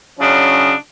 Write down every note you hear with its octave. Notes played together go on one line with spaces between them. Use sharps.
C#3 F#3 C#4 D4 E4 D#5